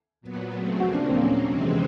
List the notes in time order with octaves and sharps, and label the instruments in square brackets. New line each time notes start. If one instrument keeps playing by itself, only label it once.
[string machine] A#2 F#3 B3
C#3 F#3 A3 C4
[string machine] D#2 C#3 F3 A#3 [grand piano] F#4
[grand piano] D4
[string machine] A#2 F#3 A#3 [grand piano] C4
[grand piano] C#4
[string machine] F2 C3 E3 G#3 C4